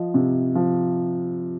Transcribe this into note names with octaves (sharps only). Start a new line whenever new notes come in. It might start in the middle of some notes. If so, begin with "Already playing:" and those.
Already playing: F3 D#5
C3
F3